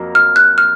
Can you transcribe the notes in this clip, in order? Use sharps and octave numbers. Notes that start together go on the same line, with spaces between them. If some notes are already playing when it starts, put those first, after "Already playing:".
Already playing: F2 F#3 A#3
F6
F#6
F6